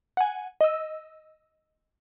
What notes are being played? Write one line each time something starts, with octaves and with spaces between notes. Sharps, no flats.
F#5 G#5
D#5 E6